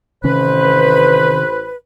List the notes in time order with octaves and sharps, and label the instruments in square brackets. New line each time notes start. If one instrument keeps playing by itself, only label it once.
[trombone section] A1 C5 [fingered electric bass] C3 D#3 C#4 [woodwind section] B4